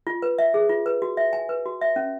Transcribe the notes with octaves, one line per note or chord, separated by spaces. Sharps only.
F4
B4
E5
G#4
F4
B4
F#4
E5
G#5
B4
F#4
E5
C#4